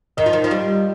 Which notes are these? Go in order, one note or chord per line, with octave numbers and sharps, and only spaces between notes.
D#3 D#5
F3
D#3
F3
G3